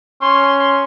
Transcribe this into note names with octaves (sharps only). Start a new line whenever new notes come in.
C#4 C6